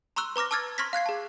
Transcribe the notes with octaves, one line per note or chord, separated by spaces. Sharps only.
A#5 C6 C#6 E6 F#6
B4 A#5 D6 F6 A#6
A5 D6 E6 F6 G#6 A6
C6 C#6 F6 G#6 A#6 B6
F5 F#6 G#6 C7
G#4 A5